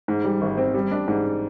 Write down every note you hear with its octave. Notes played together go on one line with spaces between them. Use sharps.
G#2
G3
G#1
C4
G3
D4
G#2